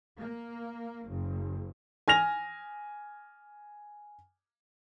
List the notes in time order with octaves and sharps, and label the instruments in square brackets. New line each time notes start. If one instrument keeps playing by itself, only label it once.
[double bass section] A#3
F#1
[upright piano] G#5 F6 A#6 F7